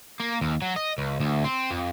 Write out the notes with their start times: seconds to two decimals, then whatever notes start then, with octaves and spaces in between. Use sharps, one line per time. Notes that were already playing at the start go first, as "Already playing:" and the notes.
0.20 A#3
0.41 D#2
0.62 F#3
0.76 D#5
0.98 C#2
1.20 D2
1.44 C4
1.71 F2